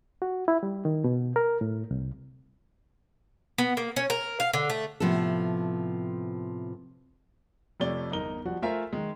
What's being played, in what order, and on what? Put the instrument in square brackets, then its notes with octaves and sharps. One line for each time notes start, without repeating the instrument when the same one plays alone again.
[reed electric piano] F#4
E4
G3
D#3
B2
A#4
A2
C2
[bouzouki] B3
A#3
C#4
A#4
F5
D3
A3
[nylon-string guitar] A2 C3 F3 B3 A4
[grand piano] F2 C3 A3 C#5 D5 G7
G1 E2 D#4 A#4 G7
F3 G3 F#4
A3 F4 A#4 C5 E5 G#5
D#3 G#3